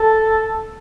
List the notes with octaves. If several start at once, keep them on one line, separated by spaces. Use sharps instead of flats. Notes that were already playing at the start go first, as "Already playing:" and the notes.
Already playing: A4